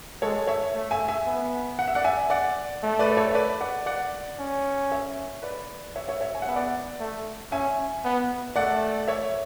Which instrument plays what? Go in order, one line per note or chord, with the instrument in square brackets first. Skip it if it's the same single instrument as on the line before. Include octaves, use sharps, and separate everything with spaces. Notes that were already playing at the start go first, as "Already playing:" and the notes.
[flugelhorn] G#3 [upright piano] A4 C#5
[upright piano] C#5 E5
[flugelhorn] A3
[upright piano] E5 G#5
E5 G#5
[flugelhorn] B3
[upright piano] F#5
E5
D5 F#5
E5 G#5
D5 F#5
[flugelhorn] A3
[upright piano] B4 D5
D5
A4 C#5
E5
B4 D5
D5 F#5
D5 F#5
[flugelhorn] C#4
[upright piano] C#5 E5
B4 D5
C#5 E5
C#5 E5
C#5 E5
G#5
F#5
[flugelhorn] B3 [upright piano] E5
[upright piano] D5 F#5
[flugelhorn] A3
[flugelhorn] C#4 [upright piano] E5 G#5
[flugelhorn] B3
[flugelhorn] A3 [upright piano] D5 F#5
[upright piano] C#5 E5